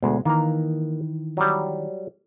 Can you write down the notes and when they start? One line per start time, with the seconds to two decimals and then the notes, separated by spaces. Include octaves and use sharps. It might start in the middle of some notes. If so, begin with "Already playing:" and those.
0.03 D2 B2 G#3
0.25 D#3 E3 A#3 A#5
1.37 F#3 G3